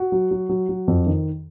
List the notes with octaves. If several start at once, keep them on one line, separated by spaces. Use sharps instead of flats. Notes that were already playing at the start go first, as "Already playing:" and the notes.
Already playing: F#4
F#3
F#3
F#3
F#3
F2
D#3